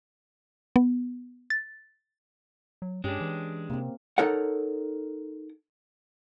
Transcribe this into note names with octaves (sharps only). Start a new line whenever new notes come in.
B3
A6
F#3
G2 G#3 C#4 D4 G4
E3
C3 A#3 C4
D#4 A4 A#4 C#5 F#5